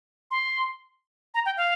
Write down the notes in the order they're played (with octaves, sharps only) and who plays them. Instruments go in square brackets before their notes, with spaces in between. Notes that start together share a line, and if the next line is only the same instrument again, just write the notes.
[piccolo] C6
A#5
G5
F5